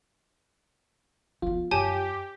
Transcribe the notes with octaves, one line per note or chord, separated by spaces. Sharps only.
F3 B3 F4
F#2 G4 C#5 G#5 A5